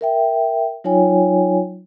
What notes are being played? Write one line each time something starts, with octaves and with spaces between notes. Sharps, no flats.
A#4 E5 G5
F#3 D#4 F4 C#5 G5 G#5